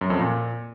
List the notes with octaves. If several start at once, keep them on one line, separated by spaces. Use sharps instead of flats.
F#2
F2
A#2